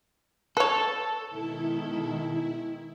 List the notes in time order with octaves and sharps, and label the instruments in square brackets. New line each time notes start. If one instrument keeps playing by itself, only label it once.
[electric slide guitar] A4 [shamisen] B4 C#5
[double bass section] B2 D#3 G#3 [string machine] E4